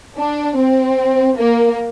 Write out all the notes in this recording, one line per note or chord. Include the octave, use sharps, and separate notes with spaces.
D4
C4
A#3